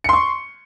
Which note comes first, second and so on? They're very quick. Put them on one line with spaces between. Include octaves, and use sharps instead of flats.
C#7 C6 C#6